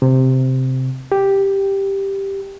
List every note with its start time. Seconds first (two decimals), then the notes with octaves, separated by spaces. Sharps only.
0.02 C3
1.12 G4